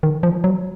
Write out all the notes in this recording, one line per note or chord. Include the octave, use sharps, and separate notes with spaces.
D#3
F3
F#3